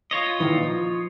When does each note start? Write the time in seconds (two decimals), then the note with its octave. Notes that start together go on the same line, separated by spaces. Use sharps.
0.11 F4 C#5 D#5
0.40 A#2 D#3 E3
0.63 F3